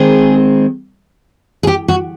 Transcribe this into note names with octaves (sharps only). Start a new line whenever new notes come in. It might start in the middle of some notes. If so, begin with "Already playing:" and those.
Already playing: D#3 G#3 C4 G#4
G#4
G4
F#4